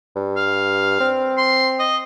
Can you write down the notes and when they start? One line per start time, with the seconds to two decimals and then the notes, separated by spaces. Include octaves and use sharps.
0.16 G2
0.36 F5
1.00 C4
1.37 C6
1.79 D#5